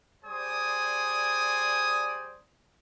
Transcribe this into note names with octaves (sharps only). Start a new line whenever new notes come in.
G3 G#4 C5 D5 G#5 D#6